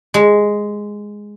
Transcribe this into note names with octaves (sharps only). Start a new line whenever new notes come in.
G#3